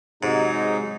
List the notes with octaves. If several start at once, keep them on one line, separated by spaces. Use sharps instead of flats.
G#2 C3 F#3 G#3 D#4